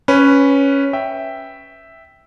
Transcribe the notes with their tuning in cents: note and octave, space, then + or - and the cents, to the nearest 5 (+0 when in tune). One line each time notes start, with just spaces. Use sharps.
C#4 +0 B4 +0
E5 +0 G5 +0